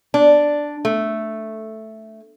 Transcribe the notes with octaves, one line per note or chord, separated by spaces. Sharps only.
D4
A3